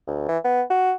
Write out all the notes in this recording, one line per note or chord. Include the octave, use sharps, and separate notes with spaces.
D2
E3
B3
F#4